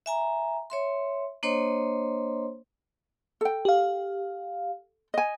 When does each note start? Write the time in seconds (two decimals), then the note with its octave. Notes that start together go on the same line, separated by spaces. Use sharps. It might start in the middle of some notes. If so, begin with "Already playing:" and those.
0.06 E5 G#5 A#5
0.70 C#5 E5 C6
1.43 A#3 D4 C5 C#5 D#5 C6
3.41 A4 G5
3.65 G4 F5
5.14 D#5 G#5